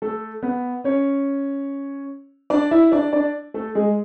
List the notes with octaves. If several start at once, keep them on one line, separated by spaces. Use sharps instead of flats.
A3 A4
B3 B4
C#4 C#5
D4 D5
E4 E5
D4 D5
D4 D5
A3 A4
G#3 G#4